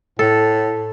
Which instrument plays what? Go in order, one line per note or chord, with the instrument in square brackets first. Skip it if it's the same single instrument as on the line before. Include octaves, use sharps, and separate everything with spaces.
[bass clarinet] A2 [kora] A4